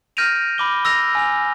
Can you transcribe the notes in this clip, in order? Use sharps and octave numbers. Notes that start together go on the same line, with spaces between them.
F6 G6 A#6 D7 D#7 F7
B5 D6 G7
E6 A#6 F7
G#5 F7